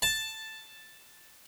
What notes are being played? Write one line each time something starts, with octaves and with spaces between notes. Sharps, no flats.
A5